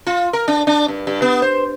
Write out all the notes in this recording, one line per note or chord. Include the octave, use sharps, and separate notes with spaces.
F4
A#4
D4
D4
G2
G2
B3
C5